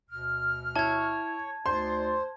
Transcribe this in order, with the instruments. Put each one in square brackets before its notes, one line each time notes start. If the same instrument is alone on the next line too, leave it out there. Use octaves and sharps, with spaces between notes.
[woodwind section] D2 B2 F6
[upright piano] E4 [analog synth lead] C#5 [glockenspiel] A5 G#6
[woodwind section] D2 D#4 D5 [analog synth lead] C5 [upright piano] C6